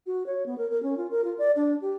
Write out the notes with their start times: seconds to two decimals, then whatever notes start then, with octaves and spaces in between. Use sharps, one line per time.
0.06 F#4
0.26 C#5
0.46 B3
0.58 A#4
0.70 A#4
0.83 C#4
0.97 F4
1.11 A#4
1.24 F4
1.38 D5
1.56 D4
1.82 G4